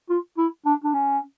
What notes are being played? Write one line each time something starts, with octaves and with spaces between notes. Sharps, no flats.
F4
E4
D4
D4
C#4